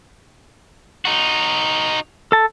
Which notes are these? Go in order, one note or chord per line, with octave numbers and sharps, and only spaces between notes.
D#4 F#4
A4 A5